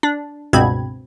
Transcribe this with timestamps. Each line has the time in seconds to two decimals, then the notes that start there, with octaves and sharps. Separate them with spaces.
0.03 D4
0.53 C#2 G2 B2 C4 B5 G#6